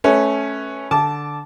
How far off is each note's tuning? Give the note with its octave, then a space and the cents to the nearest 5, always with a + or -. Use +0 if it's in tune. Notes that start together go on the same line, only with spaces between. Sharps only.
A3 -20 C#4 -5 B4 +0
D3 +0 A5 -15 D6 -5